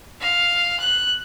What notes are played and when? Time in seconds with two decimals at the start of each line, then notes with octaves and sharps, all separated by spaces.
0.21 F5
0.80 F#6